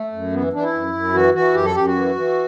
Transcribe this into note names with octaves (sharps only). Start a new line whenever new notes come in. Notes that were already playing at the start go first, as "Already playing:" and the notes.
Already playing: A3
F#2
E3 B3
E3 D4
E4
F#2
F#2
E3 F#4
E3 F#4
F#2 G4
A4
F#2 G4
F#4
E3
E3